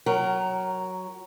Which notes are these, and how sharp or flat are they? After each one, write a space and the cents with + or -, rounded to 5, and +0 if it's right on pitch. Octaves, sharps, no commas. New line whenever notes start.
F#3 +0 A#4 +0 F#5 +35